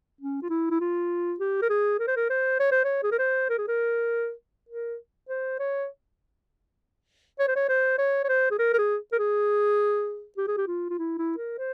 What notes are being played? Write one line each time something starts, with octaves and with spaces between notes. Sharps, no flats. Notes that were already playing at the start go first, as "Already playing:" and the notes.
C#4
F4
E4
E4
F4
G4
A#4
G#4
A#4
C5
A#4
C5
C#5
C5
C#5
G#4
A#4
C5
A#4
G#4
A#4
A#4
C5
C#5
C#5
C5
C#5
C5
C#5
C#5
C5
G#4
A#4
A#4
G#4
A#4
G#4
G4
G#4
G4
F4
F4
E4
E4
A#4
C5